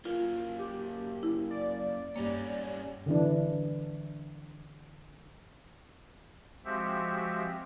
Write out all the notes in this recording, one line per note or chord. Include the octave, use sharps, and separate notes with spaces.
F#2 A#3 F4
G4
E4
D5
G2 G3 A#3 C#4
D3 E3 D4
F3 G#3 C4 F#4 G4 E5